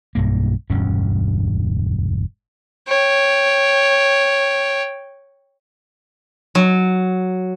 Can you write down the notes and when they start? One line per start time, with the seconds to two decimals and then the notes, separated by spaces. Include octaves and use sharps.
0.15 B1 G2 A#3
0.70 E1 D2 G2 C#4
2.88 C#5 G5
6.55 F#3